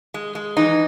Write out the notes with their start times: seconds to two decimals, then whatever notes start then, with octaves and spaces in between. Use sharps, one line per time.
0.14 G#3
0.35 G#3
0.57 E3 D#4